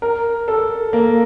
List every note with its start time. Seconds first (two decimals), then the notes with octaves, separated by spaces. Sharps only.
0.02 A#4
0.48 A4
0.93 A#3